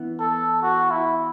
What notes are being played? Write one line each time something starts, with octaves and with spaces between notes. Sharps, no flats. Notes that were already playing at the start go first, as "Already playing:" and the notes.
Already playing: E3 B3
A4
F#4
E4